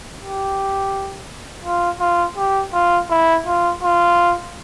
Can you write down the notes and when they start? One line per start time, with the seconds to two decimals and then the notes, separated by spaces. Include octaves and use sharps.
0.18 G4
1.64 F4
2.00 F4
2.37 G4
2.73 F4
3.10 E4
3.47 F4
3.83 F4